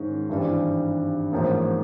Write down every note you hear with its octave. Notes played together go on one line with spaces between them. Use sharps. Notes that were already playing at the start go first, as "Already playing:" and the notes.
Already playing: G#2 D#3 G#3 C#4
G#1 G2 E3 G3
A1 G#2 F3 A#3